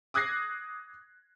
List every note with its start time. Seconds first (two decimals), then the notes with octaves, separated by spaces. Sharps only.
0.14 D6 D#6 F#6 G#6 A#6 C7